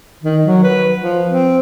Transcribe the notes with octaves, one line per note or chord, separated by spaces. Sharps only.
D#3
F#3
B4
F3
C4